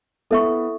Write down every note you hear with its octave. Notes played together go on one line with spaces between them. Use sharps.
B3 E4 A4 E5 C#6